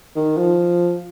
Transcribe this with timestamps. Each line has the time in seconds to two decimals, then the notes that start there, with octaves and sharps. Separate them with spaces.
0.16 D#3
0.38 F3